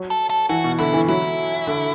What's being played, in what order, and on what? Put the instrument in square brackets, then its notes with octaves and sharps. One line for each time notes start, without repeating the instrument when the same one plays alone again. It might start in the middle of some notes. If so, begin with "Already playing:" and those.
Already playing: [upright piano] F#3
[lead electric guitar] A4
A4
[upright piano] E3 [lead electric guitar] F#4
[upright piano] B2
[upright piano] D3 [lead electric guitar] E4
[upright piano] E3
[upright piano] F#3 [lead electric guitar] E4
[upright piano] D3